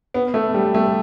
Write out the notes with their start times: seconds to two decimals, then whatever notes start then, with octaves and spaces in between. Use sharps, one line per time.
0.14 B3
0.34 A3
0.54 G3
0.75 A3